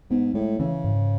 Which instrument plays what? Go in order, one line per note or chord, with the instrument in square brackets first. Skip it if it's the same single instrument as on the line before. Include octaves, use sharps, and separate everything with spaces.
[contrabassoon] G#2 [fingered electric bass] B3
[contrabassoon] A2 [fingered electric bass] G#3
[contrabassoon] C#3 [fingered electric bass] E3
[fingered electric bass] G#2